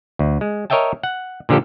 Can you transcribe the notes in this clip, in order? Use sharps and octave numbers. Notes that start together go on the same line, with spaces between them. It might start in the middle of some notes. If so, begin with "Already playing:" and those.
D2
G#3
A#4 C#5 D#5 E5 G5 A5
F#5
A#2 D3 F3 G4 A4